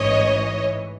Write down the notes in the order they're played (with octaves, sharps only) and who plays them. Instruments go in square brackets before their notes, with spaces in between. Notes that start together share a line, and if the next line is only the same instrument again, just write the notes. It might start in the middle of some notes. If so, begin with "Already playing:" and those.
Already playing: [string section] A1 G#2 E3 C#5 D#5